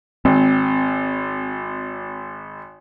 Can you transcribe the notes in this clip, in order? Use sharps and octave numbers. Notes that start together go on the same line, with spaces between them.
G#1 C4